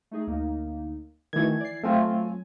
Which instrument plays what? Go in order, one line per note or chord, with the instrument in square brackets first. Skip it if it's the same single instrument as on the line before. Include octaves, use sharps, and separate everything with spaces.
[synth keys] A3 D#4 G#4
D2 A#3 D#4
[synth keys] D#3 A3 F#4 [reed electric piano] E3 G#6
[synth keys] D5 C7
[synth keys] F#3 G#5 [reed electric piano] A3 C4 F4